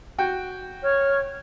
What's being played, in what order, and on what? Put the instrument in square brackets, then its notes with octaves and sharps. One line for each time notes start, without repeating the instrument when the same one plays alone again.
[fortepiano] F#4 G5
[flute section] C#5 C#6 F6